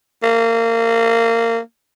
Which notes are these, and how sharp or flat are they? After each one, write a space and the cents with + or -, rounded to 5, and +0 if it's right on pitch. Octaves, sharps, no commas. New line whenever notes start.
A#3 -25